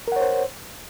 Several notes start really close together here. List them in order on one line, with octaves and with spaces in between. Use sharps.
A#4 F#5 C#5 C5